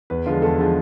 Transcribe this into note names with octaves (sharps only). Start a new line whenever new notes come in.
E2 B4
D3 F3 G#3 F4
E2 A4
D3 F3 G#3